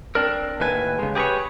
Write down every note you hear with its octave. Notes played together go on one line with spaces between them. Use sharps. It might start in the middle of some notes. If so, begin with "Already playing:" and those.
C4 D4 A#4
D#2 A2 B4 G#5
C#3 G#3
G4 G#4 A#4 B4 C#5